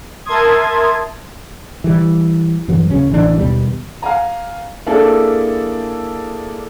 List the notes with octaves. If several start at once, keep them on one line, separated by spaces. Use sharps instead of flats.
A#4 E5 A5 C6 D#6 G#6
E3 G3
G2 E3 F#3
D#2 C#3 C#4
A1 E3 D4
D#2 B2 G3
F5 F#5 G#5 A#5
A#3 D4 E4 G#4 A4